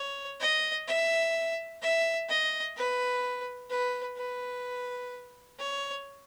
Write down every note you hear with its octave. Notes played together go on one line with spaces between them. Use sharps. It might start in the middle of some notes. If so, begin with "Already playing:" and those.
Already playing: C#5
D#5
E5
E5
D#5
B4
B4
B4
C#5